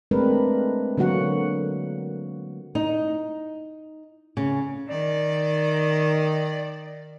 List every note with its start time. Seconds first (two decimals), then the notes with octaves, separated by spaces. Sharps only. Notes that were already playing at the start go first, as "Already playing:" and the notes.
0.11 G#3 A3 C4 D4 A#4 B4
0.97 D3 F#3 A#3 F#4 F#5
2.75 D#4
4.37 C#3
4.88 D#3 D5